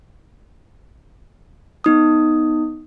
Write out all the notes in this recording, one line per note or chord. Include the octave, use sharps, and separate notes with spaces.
B3 D#4 D#6